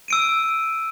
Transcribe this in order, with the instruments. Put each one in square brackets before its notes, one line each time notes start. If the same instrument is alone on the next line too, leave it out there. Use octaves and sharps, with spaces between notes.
[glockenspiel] E6 D7 D#7